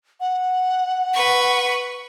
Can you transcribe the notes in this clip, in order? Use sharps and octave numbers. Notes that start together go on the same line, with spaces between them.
F#5
B4 C#6